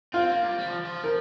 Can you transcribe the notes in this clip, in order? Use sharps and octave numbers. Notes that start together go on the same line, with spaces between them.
C4 F4
A#3
G3
G3
F3
F3
A#4